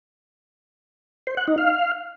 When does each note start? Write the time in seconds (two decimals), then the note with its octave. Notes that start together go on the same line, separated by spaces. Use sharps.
1.27 C5
1.37 F#5
1.48 D#4
1.58 F5